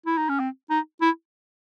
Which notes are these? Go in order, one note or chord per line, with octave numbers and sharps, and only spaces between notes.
E4
D#4
C#4
C4
D#4
E4